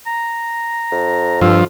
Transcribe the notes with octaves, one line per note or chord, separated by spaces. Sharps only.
A#5
F2
G2 F3 E6